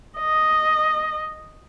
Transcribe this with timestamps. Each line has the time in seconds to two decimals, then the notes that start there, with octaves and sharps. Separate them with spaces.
0.19 D#5